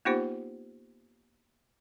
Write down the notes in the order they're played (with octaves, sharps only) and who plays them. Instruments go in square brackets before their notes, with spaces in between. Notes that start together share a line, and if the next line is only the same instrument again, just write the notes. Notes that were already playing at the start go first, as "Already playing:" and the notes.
[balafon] A#3 B3 D#4 F4 G4 C5